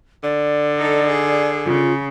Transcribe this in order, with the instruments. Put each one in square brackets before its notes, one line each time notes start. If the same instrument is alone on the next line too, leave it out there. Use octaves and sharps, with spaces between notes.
[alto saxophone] D3 [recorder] D5
[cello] D#4 A4
G#4
[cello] C#3 [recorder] F4